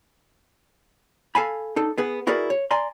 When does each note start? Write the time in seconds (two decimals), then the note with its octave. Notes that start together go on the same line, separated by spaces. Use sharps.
1.35 A4 F5 G#5 B5
1.76 D4 D#4 A4
1.98 B3 G#4 B4
2.27 E4 F#4 G#4 A#4 B4 D5
2.50 C#5
2.71 D5 G#5 A#5 C6